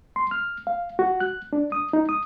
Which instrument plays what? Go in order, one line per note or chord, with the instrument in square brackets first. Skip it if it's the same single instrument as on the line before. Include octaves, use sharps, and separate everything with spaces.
[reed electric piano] C6
F6
F5
F#4
F#6
D4
D#6
D#4
D#6